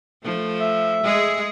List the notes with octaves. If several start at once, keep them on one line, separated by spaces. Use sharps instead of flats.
F3 A3
E5
G#3 G#4